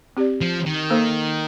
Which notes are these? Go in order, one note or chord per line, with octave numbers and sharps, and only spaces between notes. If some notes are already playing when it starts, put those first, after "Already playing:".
C4 G4 D5
F3
D#3
A#3 D#4 A4 C5